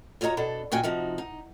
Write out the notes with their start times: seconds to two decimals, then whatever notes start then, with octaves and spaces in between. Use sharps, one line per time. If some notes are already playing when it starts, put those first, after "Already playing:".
0.21 F4 F#4 C#5 D#5 A#5
0.37 B2 D4 A4
0.72 D#2 A#2 F#4 G5 G#5
0.83 C3 F3 D#4 F#4
1.18 D#4